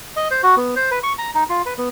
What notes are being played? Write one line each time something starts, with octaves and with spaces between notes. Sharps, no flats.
D#5
C5
F#4
B3
C5
B4
C#6
A#5
D#4
F4
B4
B3